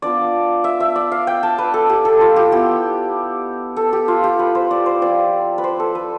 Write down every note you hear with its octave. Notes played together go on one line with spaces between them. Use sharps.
B3 D4 F4 D5
E5
E5
D5
F5
G5
A5
B4
A4
G4
A4
F4
G4
B3 E4 G4
A4
G4
F4
G4
B4
C5
D5
C5
F3 C4 E4 D5
B4
C5
A4
B4